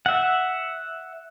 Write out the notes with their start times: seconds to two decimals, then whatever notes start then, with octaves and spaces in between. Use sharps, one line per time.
0.06 E5 F#5